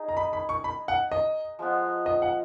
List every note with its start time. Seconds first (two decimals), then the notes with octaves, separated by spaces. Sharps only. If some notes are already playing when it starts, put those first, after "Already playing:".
Already playing: D#4 G#4
0.09 A#5
0.17 B5
0.33 B5
0.49 C#6
0.64 B5
0.88 F#5
1.12 D#5
1.59 F3 G#3 B3 F4
2.06 D#5
2.22 F#5